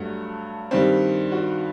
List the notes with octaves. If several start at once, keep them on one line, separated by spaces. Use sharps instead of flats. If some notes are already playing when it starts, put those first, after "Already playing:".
Already playing: G2 F#3 A3 F#4
G2 D#3 G3 C4
F#4